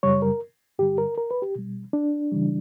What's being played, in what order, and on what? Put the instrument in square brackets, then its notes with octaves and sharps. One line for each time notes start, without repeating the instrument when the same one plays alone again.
[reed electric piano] F#2 C#3 G3 C#5
A#4
G2 D3 G3 G4
A#4
A#4
B4
G4
B2 G3
D4
C#3 E3 G3